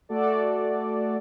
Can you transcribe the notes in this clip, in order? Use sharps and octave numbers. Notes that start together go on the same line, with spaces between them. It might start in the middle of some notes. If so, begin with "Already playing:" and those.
A3 F#4 A4 D5